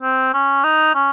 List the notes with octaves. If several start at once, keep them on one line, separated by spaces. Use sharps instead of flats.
C4
C#4
D#4
C#4